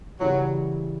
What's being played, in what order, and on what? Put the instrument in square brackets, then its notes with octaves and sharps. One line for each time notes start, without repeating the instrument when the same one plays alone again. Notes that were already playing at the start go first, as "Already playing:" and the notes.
[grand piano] C#3 E3 G3 [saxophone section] F#3